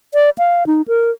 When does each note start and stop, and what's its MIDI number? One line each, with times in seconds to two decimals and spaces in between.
0.14 0.30 74
0.38 0.66 77
0.67 0.82 63
0.88 1.11 70